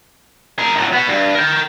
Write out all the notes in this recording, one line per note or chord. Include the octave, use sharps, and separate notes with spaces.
G#4 A#4
A2 F#3
B3 F#4
G2
A#4 G5